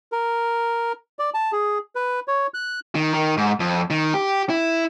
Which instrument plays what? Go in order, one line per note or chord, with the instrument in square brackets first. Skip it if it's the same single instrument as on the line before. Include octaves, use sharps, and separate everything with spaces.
[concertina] A#4
D5
A5
G#4
B4
C#5
F#6
[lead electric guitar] D#3
D#3
G#2
F2
D#3
G4
E4